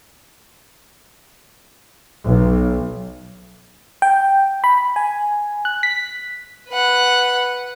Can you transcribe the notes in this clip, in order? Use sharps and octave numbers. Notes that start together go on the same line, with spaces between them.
B1
G5
B5
G#5
F#6
B6
B4 F#5